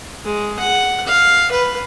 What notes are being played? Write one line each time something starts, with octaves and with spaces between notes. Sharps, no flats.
G#3
F#5
F5
B4